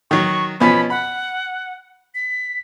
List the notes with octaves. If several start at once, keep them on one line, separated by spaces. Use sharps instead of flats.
D#3 F#3 C#6
B2 F3 C#4 B5
F#5 B5
B6